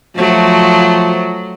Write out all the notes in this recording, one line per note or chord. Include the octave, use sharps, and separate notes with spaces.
F3 F#3 A3